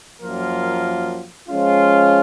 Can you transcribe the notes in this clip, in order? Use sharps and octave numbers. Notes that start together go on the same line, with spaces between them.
F#2 F3 A#3 F4 A#4
F3 G#3 C#4 F4